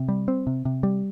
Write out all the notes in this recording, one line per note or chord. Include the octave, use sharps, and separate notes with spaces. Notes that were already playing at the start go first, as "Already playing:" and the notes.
Already playing: C3
G3
C4
C3
C3
G3